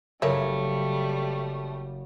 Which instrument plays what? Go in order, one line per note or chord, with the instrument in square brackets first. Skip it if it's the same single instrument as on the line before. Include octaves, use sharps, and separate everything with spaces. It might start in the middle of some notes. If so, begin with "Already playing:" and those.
[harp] F#1 [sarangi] G3 [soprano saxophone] A3 [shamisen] A#4 C#5 E5